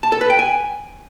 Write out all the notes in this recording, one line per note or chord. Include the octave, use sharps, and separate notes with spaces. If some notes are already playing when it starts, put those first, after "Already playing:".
A5
A4
B4
G5
G#5